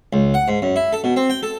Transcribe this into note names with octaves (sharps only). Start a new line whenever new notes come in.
C#2
F#5
G#2
F#2
E4
A4
B2
C4
G5
A4